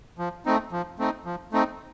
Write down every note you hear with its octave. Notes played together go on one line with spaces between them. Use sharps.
F3
A3 C4 D#4
F3
A3 C4 D#4
F3
A3 C4 D#4